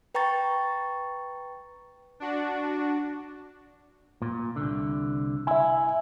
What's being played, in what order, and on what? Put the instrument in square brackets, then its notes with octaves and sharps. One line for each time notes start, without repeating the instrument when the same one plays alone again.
[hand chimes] B4 G5 A#5 C#6 A6
[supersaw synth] D4 F#4
[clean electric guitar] A#2
C2 D3
[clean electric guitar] E4 [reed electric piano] E5 G#5